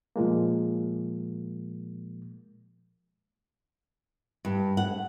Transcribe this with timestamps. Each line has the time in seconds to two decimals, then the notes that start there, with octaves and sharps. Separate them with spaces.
0.16 A#2 F3 G#3 A#3
4.45 G2
4.77 F#5